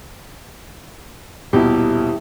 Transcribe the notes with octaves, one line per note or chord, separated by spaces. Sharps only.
D#1 B2 E4 G4